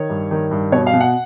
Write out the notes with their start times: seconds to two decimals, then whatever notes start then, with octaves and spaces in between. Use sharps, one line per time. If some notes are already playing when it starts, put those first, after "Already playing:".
Already playing: D#3 C#5
0.10 G2
0.31 D#3
0.51 G2
0.72 B2 C#5
0.86 F5
0.93 B2
1.00 F#5